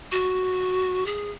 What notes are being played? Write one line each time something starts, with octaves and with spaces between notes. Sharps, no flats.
F#4
G#4